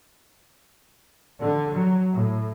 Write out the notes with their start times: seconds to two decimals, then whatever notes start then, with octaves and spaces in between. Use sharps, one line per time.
1.39 D3
1.72 F#3
2.12 A2